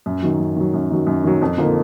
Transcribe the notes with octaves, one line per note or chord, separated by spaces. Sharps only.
F#2
D#3 F#3
F#2
D#3 F#3
F#2
D#3 F#3
F#2
D#3 F#3
F2
D3 F3 A#3 D#4